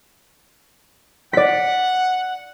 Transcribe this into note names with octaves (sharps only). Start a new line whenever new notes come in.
D5 F#5 B6